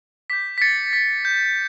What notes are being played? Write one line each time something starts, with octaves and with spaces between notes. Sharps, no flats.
D6 G6 B6
B6
A6 C#7
B6
G6